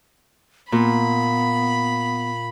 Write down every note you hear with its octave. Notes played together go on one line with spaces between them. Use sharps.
A#2 B3 B5